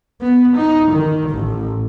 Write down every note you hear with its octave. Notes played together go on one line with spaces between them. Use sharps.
B3
D#4
D#3
A1